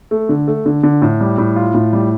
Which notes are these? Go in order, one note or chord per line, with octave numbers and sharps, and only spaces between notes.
A3
D3
A3
D3
D3
A2
G3
A2
F4
A2
G3